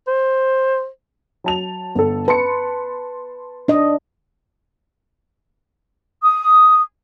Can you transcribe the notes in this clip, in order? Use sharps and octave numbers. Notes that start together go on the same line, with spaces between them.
C5
F#3 A5 F7
G1 A4
B4 A5 C6 C#7
D4 D#5
D#6